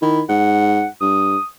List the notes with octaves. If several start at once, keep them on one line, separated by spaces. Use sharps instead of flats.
D#3 E4
G#2 F#5
G2 D#6